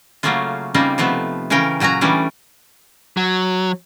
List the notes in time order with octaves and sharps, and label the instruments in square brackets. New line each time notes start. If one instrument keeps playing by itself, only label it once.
[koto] C#3 F#3 A3 A#3 C#4 F4
C#3 G3 A#3 C4 D#4 F4
C3 F3 A3 B3
C#3 E3 C#4 A#4 G5
A#2 F#3 C#4 F#4 A#5
E3 G3 A3 C#4 D4
[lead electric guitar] F#3